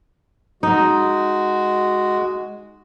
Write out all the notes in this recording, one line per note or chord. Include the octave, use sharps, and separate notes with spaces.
G#3 D#4 F#4